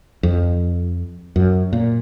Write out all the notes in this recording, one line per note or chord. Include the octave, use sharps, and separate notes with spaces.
F2
F#2
A#2